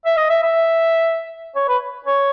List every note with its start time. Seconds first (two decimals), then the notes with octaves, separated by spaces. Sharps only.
0.05 E5
0.17 D#5
0.29 E5
0.43 E5
1.55 C#5
1.68 B4
2.06 C#5